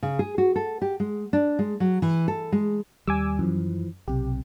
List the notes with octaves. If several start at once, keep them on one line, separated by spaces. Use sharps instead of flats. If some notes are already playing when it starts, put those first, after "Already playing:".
C#3
G#4
F#4
A4
G4
G#3
D4
G#3
F#3
E3
A4
G#3
D#2 G3 G#5 D6 E6
F#2 E3 F3
B1 C3 G4